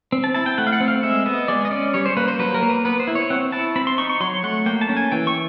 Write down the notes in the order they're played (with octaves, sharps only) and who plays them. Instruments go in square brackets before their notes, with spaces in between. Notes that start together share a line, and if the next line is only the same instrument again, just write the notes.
[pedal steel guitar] C4
A5
E4 A5
G5
A3 F#5
F5
F#5
C4
F5
G#3 E5
B3 D#5
G#3 D5
D#5
C#4 D5
G3 C#5
C5
A#3 B4
C5
F#3 B4
A#4
A#3
B4
B3 B4
C5
E4
C#5
C4 F#5
E4 A5
C4 B5
C6
D#4 C#6
C#6
F#3 C6
A3 F#5
A#3 G5
A5
C#4
G#5
E3 G5
C#6